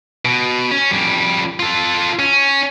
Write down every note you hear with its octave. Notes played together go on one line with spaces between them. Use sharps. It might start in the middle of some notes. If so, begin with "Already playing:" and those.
B2
C#4
F2 G3
F4 A4
C#4